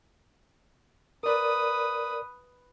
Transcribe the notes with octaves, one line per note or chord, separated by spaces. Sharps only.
A#4 B4 D5 D#6